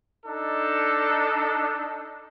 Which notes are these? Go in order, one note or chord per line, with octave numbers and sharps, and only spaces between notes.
D4 D#4 A4